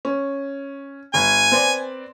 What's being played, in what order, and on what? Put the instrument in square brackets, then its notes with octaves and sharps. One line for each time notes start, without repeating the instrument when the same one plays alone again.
[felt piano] C#4
[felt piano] G1 [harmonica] G#5
[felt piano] C4 B4 D5